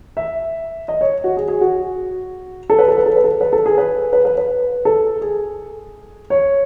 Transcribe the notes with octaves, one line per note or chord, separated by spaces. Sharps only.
E5
D#5
C#5
F#4
G#4
G#4
F#4
A4
B4
A4
B4
A4
B4
A4
B4
A4
G#4
B4
B4
B4
B4
A4
G#4
C#5